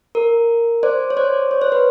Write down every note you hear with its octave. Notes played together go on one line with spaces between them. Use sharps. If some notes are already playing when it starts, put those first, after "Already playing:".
A#4
C5 D5
C#5
C5 D5
C#5
C5
B4